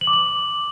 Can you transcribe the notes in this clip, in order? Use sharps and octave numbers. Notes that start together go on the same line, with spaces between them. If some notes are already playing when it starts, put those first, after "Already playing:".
F#7
D6
F#7